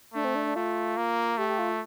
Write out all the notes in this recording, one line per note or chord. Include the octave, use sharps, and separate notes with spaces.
A3 D4
C4
D4
D4
A3 F4
A#3
A3 G4
G4
F4